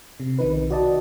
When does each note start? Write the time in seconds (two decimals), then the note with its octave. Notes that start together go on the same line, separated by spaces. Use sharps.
0.20 C3
0.39 B1 D#3 D#4 B4
0.70 F#4 D5 D#5 A5